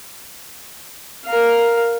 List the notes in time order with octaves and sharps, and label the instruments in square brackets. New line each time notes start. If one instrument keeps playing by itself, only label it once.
[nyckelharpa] A#4 F5